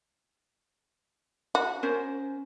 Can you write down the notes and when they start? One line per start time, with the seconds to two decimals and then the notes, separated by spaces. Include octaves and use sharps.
1.55 F#4
1.83 C#4 A#4 C5